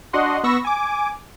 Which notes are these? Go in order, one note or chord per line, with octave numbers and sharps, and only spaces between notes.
D4 F#4 D#5 F#5 C6
B3 B5 C#6 E6 A#6
G#5 D6